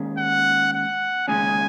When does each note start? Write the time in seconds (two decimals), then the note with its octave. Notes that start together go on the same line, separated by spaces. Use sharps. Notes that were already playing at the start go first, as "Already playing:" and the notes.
Already playing: D#2 D#3 G#3 C#4
0.18 F#5
0.74 F#5
1.28 D#2 C#3 G#3 C#4 G#5